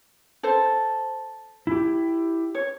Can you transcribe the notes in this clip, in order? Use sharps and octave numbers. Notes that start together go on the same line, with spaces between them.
A4 C5
E4 G4
C#5